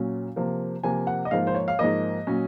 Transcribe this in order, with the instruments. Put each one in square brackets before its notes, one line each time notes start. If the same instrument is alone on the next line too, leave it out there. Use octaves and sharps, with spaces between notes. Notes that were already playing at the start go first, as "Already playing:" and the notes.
Already playing: [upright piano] A#2 F#3 C#4
C3 F3 A#3
C3 F3 A#3 G#5
F#5
D#5
G#2 F3 A#3 F5
C5
C#5
F5
G#2 F3 A#3 D#5
A#2 F#3 C#4